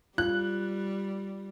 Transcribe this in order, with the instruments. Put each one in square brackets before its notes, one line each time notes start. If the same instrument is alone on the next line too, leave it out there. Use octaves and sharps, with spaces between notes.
[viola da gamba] G3 [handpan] F4 [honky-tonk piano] F#6